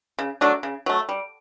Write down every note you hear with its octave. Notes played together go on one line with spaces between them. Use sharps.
C#3
F#3 A3 D4
C#3
F#3 A3
G3